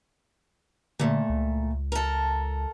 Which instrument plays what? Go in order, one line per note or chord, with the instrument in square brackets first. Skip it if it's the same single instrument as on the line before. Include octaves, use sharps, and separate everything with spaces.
[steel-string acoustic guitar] A#2 A3 [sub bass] D3
[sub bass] C#2
[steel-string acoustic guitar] A4 A#4